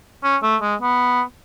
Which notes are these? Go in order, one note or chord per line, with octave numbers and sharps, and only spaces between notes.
C#4
A3
G#3
B3